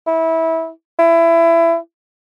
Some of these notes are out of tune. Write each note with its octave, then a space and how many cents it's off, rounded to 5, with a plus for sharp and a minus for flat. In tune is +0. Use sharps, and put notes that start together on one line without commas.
E4 -20
E4 +20